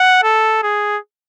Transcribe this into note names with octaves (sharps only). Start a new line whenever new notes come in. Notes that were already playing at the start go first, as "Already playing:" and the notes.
Already playing: F#5
A4
G#4